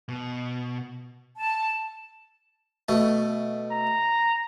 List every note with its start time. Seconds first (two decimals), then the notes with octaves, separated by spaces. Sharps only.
0.09 B2
1.37 A5
2.89 B2 A3
3.71 A#5